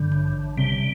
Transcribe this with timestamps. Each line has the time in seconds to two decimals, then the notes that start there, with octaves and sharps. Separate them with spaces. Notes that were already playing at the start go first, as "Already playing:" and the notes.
Already playing: G2 D3
0.12 A1
0.57 C3 G3